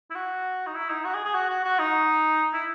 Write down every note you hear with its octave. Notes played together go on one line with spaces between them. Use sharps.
E4
F#4
D#4
E4
D#4
F#4
G#4
G#4
F#4
F#4
F#4
D#4
E4